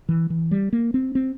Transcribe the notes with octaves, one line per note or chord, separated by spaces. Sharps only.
E3
E3
G3
A#3
C4
C4